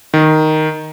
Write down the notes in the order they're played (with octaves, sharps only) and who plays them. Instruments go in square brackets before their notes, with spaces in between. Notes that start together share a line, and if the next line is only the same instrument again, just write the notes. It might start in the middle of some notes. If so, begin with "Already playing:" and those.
[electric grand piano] D#3